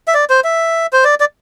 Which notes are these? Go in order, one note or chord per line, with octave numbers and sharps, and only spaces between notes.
E5
D5
C5
E5
C5
D5
D5